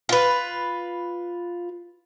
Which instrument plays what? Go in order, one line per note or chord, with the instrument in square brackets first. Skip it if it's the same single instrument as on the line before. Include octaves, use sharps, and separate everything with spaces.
[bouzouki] F4 B4